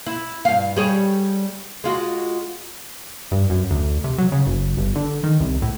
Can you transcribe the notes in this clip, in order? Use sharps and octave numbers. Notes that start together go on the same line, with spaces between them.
E4
G2 F5
G3 G#4 C#5
G#3 F4 F#4
G2
F#2
D2
C3
F#3
C#3
F#1
G1
D3
D#3
C2
A2